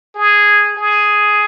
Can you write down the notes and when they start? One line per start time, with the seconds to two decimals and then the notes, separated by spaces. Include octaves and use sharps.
0.15 G#4
0.77 G#4